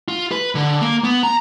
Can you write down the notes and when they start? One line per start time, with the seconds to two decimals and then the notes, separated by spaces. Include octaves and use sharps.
0.08 F4
0.32 B4
0.55 D3
0.81 A#3
1.04 B3
1.23 A#5